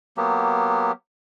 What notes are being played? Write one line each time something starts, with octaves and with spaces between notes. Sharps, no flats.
F#3 A#3 B3 G4